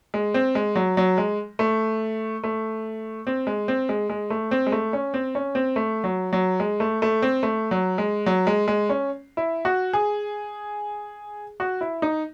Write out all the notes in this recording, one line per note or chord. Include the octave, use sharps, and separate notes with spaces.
G#3
C4
G#3
F#3
F#3
G#3
A3
A3
C4
G#3
C4
G#3
G#3
A3
C4
G#3
A3
C#4
C4
C#4
C4
A3
F#3
F#3
G#3
A3
A3
C4
A3
F#3
G#3
F#3
G#3
G#3
C#4
E4
F#4
G#4
F#4
E4
D#4